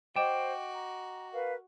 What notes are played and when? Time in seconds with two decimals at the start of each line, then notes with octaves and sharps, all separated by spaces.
0.16 F#4 C5 D#5 G5 D6 E7
0.73 A#5
1.32 A#4 B4 F5